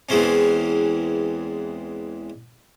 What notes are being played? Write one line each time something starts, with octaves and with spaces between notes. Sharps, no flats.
E2 E3 G#3 C4 C#4